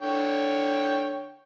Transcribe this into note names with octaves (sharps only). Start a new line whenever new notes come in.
D3 C#5 G5